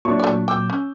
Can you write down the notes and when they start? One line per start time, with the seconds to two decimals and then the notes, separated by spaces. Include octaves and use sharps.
0.05 A#2 F#3 D4 E4 C#6
0.19 A3 D5
0.48 G5 D6 E6 G6
0.70 C#4